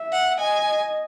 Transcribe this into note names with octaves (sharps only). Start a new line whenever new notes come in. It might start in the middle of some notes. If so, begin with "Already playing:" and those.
Already playing: E5
F#5
D#5 G#5